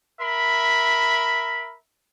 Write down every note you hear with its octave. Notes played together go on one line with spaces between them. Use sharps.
A#4 E5 B5